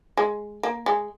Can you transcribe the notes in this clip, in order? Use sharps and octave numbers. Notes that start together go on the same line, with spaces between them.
G#3
A#3
G#3